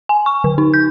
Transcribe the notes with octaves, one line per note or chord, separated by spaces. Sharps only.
G#5
C#6
D3
D#4
G6